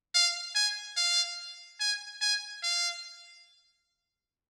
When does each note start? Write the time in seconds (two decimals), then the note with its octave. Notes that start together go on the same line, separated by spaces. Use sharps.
0.15 F5
0.55 G#5
0.97 F5
1.80 G#5
2.21 G#5
2.64 F5